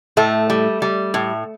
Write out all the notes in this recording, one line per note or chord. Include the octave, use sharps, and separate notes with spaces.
A2 A3
G3
G3
A2